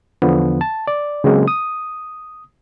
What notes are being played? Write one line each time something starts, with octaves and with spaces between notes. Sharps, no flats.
E2 D3 F3 B3
A5
D5
C#3 F#3 G#3 A#3 C4
D#6